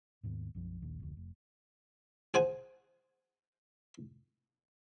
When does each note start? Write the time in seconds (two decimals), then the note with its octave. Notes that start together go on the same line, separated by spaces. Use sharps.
0.23 D#2 G#2 D#3 B3
0.55 B1 F#2 F3
0.82 A#1 D#2
1.00 F1 D2
1.17 F1
2.34 G#4 C5 F#5 G#5